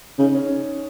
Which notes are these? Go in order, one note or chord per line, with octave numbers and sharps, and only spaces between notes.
C#3 D#4
C#4